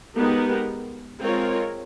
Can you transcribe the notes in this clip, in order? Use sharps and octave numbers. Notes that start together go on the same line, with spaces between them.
G#3 B3 D#4 G4 A#4
G#3 C4 F4 A#4 C#5